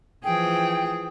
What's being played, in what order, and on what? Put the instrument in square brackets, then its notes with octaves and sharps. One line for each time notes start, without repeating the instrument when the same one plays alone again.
[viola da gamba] E3 F3 G#4 [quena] G5